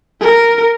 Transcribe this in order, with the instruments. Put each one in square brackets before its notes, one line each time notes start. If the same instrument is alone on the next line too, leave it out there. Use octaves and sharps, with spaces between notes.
[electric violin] A#4